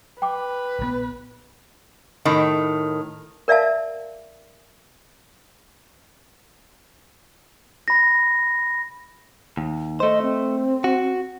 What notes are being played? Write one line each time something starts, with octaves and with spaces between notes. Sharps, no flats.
B4 G5 D6
A#1 D3 B3
A2 D#3
A#4 D5 E5 F5 A5
B5 A#6
D#2
A3 C5 D#5
C4
F#4